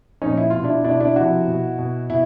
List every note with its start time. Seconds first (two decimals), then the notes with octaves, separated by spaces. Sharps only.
0.22 A#2 F3 C#4 D#4
0.37 E4
0.50 B2 F4
0.64 D4 E4
0.84 B2 D4 E4
1.00 D4 E4
1.16 C3 F3 E4 F#4
1.48 B2
1.79 B2
2.10 B2 E4